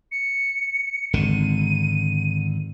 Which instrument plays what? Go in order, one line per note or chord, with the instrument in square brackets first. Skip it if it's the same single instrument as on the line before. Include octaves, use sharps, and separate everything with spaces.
[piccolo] C#7
[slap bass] G#1 D3 [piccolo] D#7